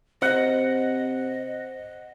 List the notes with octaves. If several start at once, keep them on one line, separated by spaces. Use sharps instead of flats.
C3 C5 D#5 F#5